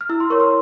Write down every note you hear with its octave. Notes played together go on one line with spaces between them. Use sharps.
F6
E4 E6
C6
A#4 C#5 C#6
C6